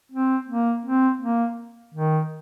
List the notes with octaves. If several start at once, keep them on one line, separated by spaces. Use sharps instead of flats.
C4
A#3
C4
A#3
D#3